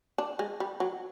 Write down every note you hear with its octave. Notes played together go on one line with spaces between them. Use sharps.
D4
G#3
G3
F#3